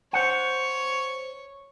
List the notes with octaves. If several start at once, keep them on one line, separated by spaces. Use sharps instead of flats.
C5 C#5 F#5